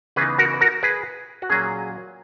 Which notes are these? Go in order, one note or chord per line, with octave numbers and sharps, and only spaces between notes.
C#3 E3 B3 D#4 G#4 B4
F#4 A#4
B4
F#4 A#4
G#4 B4
F#4
A#2 F#3 A#3 C#4 G#4